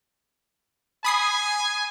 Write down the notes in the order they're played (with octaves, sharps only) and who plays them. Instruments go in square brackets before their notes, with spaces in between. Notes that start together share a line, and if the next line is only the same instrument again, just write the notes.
[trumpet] G#5 [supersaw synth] B5 D#6 C7